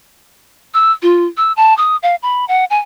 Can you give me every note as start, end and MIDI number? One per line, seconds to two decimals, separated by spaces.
0.74 0.92 88
1.02 1.25 65
1.37 1.52 88
1.57 1.75 81
1.77 1.96 87
2.03 2.15 77
2.23 2.45 83
2.48 2.65 78
2.70 2.79 80